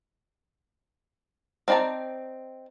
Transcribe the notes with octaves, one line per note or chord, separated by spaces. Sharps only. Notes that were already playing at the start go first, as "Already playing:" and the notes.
C4 D#4 D5 A5 A#5